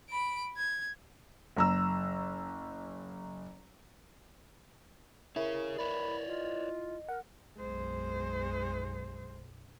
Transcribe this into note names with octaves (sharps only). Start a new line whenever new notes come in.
B5 D7
G#6
F#1 A#5 E6
E4 G#4 A#4 C#5
B4 C#5 D5 B5
F4 D#5
A#4 F#5
B1 F#2 G#3 C5